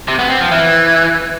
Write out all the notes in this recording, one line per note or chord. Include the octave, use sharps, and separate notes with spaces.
C3
B3
C4
F3
E3